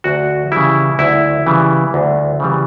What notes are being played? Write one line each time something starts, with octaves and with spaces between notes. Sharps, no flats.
D2 F#4
C#3 E3 G3 E4
D2 E4
C#3 E3 G3
D2
C#3 E3 G3